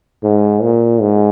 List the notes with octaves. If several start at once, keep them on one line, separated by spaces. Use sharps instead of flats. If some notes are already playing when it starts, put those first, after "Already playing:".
G#2
A#2
G#2